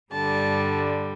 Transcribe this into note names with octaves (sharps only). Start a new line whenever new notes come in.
G2 D3 G3 A5